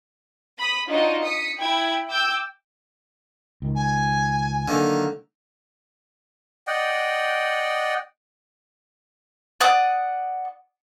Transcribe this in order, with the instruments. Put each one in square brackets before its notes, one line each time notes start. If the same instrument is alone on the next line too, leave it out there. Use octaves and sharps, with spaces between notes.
[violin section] B5 D#6
D4 D#4 F4 F#4 C#5 D#5
D#6 B6 C#7
E4 G5 B5 G#6
G5 D6 E6 G6
[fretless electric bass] C#2 D#3
[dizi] G#5
[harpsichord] D3 D#3 A#3 [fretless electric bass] F#3
[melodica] D5 D#5 F#5 G5
[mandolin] D5 F#5 D#6